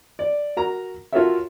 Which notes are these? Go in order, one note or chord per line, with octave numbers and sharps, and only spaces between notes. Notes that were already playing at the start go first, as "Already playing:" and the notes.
D5
F#4 A#4 A#5
F4 F#4 A4 A#4 C#5 E5